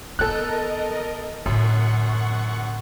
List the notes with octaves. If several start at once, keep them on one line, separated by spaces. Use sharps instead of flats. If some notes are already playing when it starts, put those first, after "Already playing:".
D#3 B3 A4 A#4 D#5 F#6
F#2 A2 D3 F#5 C#6